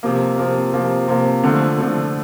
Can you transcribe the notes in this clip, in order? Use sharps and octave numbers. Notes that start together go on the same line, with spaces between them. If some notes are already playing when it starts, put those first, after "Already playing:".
C3 F3 A#3
C3 F3 A#3
C3 F3 A#3
C3 F3 A#3
D3 F3 A3
D3 F3 A3